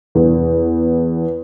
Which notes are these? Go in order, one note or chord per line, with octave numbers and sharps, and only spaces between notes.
E2